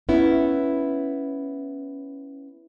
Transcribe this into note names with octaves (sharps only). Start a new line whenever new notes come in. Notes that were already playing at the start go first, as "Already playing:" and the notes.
B3 C#4 E4